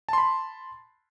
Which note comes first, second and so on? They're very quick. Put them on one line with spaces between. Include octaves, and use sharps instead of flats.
A5 C6 B5